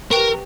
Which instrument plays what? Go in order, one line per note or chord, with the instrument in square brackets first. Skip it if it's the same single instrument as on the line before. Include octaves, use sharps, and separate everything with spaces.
[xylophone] G4 B4 G5 C#6 [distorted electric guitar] A#4